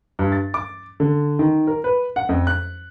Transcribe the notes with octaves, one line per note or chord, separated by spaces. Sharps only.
G2
A6
D6
D3
D#3
A#4
B4
F#5
F2
F#6